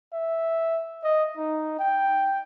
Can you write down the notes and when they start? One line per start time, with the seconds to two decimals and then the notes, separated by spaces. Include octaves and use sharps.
0.13 E5
1.03 D#5
1.37 D#4
1.79 G5